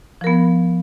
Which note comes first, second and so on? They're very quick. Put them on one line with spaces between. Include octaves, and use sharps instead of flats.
F3 A#4 B3